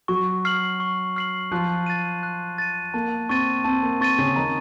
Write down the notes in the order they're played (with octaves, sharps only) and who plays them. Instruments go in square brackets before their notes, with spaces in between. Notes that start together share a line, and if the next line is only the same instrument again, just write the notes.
[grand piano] F#3 F#4 [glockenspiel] C#6
[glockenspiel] F6 C7 F#7
C#6
F6 C7 F#7
[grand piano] F3 F4 [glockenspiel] F#6
[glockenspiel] A6 D#7
F#6
A6 D#7
[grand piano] A#3 [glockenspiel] A5
[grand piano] C4 [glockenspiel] C#6 A6 D#7
[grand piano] C4 [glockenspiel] A5
[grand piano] A#3
[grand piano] C4 [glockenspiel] C#6 A6 D#7
[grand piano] C#3 C#4
[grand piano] D#3 D#4 [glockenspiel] A#5